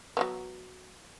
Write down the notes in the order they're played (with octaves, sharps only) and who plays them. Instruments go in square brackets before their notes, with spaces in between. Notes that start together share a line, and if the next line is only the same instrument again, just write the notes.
[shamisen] F#3 G#3 B3